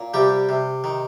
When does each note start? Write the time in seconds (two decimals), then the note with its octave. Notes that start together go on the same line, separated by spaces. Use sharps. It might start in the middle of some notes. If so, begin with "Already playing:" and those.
Already playing: A#2
0.14 C3 G3 G4
0.49 C3
0.84 D#3